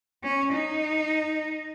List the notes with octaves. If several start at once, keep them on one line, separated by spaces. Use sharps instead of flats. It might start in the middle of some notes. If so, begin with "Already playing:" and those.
C#4
D#4